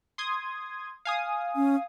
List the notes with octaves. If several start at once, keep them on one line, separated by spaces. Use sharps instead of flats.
C6 D#6 G#6
F5 G#5 D#6
C#4